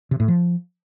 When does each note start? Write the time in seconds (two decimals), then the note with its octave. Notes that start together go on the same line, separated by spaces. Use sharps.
0.11 C3
0.20 A2
0.28 F3